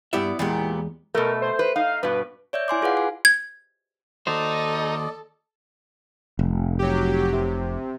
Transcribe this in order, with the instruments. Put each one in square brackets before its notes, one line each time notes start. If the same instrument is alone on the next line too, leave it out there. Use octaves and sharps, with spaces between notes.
[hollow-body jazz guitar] G2 G4 E5 [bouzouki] B3 D5 [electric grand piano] E4
[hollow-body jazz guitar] E2 G#3 [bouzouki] A#2 B3 G4
[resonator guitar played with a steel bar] B2 A3 [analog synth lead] A#4
[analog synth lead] C5
[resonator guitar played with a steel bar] B4
[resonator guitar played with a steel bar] D#4 [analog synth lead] F5
[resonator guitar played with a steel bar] G2 B2 [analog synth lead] B4
[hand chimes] C#5 D5 E5 G6
E4 G#5 C6 D6
F4 G#4 B4 F5 F#5
G#5
[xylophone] G#6
[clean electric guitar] D#2 F#4 C5 [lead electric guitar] D#4 [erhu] A4 [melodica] D5 D#5
[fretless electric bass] F1
[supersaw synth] F#3 G4
C3